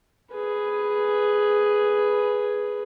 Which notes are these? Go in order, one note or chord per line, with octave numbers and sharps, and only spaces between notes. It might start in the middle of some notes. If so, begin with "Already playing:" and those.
G#4 B4